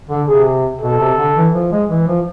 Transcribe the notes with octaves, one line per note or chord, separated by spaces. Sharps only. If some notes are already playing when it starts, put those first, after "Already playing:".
D3
C3 G#4
B2 A4
C3
D3
E3
F3
G#3
E3
F3